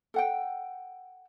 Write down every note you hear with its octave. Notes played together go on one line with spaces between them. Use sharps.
A4 F#5 G5